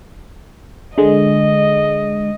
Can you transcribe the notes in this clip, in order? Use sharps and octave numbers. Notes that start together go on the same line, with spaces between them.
D3 G#3 D#5